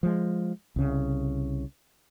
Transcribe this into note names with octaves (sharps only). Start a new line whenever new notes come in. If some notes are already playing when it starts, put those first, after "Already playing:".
F3 G#3
C2 C#3